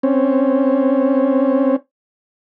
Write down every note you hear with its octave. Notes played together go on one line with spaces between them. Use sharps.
C4 C#4